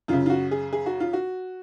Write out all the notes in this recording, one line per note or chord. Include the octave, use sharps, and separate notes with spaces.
F#2 C#3 F4
F4
F#4
G#4
G#4
F#4
F4
F#4